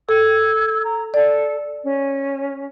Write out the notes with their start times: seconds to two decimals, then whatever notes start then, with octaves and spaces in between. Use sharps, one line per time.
0.09 A4 E6 G#6
0.84 A#5
1.14 A4 D5
1.83 C#4